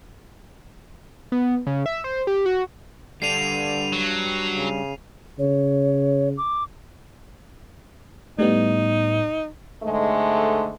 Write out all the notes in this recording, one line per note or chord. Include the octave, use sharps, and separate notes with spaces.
B3
C#3
E5
C5
G4
F#4
D3 G3 D4 C7 D#7 F7
F#3
C#3
C#3 C#5
D6
A2 G3 B3 D#4
G#2 D3 G#3 A3